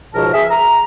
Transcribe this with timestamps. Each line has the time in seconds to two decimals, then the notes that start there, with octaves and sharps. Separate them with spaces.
0.14 C#2 G#2 B2 F3 A#4 A5
0.33 G#4 E5
0.50 A#5